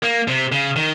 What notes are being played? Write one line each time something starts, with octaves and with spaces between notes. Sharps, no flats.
A#3
C3
C#3
D#3